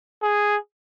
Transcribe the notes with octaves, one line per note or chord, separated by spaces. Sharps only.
G#4